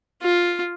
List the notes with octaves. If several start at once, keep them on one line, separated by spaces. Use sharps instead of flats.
F4